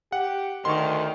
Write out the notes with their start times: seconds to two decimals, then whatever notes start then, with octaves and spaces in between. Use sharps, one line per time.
0.12 G4 F#5
0.65 D2 D#3 C6 C#6